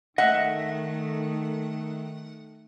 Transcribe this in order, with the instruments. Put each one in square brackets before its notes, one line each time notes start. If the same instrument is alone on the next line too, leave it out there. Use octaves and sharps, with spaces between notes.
[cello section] D#3 A3 [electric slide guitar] D#5 E5 [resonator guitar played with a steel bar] F#5